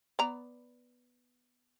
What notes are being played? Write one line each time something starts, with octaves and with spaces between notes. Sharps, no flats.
B3 D5 A#5